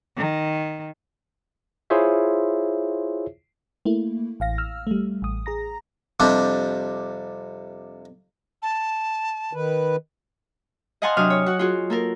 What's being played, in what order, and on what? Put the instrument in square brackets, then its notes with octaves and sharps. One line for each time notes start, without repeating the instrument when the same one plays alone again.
[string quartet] D#3
[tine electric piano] E4 F4 G#4 C5 C#5 E5
[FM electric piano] A3 A#3 E4
A1 F5 A#6
E6 F6
G3 A3
A1 D#6
G#4 A#5 A#6
[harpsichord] F2 C3 G3 D4
[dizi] A5
[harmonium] D#3 B4
[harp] D#5 F5 F#5 G#5 A5 C6
C3 F#3 D4 G#5 D#6 F6
C#5
F#4 F#5
F4 F#4 G#4
A#3 A4 A#4